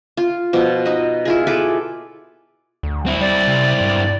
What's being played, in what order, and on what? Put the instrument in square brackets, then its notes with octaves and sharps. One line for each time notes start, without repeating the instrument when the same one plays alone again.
[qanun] F4
B2 F3
D#4 D#5
E4 F4 G#4
G#4 A4 B4 D6
[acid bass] D2
[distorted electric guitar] C4 E4
[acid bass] G3 [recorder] D5
[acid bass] C3
G2